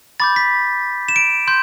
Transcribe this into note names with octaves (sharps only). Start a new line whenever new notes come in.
B5 D6 G6 A6
B6
E7
D7
C6 G6